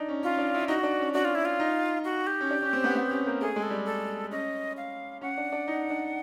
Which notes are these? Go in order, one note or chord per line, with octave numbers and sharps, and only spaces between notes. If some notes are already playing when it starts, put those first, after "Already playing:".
Already playing: D4 D#4
C#4
C#4 F4
D4
E4
D#4 F#4
D4
C#4
D4 F#4
F4
E4
F4
D#4
F#4
G4
C#4
D4
C#4
C4
B3
B3
C#4
A#3
A3 G#4
G#3
A4
G3
A4
C#4 D#5
F5
C#4 F#5
D4
D4
D#4
D4